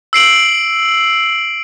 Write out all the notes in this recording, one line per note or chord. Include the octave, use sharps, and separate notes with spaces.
E6 C7 D7 F#7